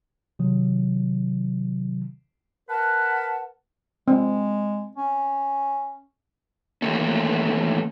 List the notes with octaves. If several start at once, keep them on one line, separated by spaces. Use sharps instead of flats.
C3 D#3 F#3
A#4 B4 F#5 A5
G#3 C4
C#4
E2 G2 D#3 A3 A#3 C#4